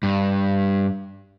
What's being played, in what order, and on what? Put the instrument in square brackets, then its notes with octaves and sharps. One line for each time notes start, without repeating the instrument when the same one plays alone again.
[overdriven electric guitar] G2